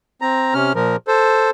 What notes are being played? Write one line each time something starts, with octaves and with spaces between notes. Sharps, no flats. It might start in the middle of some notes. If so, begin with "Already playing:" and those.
C4 A#5
C3 C#4 F6
A#2 F3 A#4
A4 C5